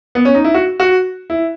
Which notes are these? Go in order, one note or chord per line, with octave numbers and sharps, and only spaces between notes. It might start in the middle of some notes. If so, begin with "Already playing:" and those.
B3
C#4
D#4
E4
F#4
F#4
E4